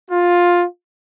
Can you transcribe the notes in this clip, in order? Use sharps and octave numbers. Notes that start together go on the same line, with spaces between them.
F4